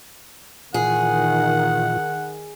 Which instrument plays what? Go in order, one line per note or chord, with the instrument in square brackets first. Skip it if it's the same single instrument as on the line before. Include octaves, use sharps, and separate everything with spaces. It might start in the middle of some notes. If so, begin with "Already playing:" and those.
[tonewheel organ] A#2 E3 F4 [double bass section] D#3 [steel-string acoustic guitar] G#4 [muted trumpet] F#5